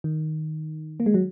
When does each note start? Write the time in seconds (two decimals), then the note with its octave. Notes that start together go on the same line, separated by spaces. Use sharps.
0.04 D#3
1.00 A#3
1.06 G#3
1.14 F#3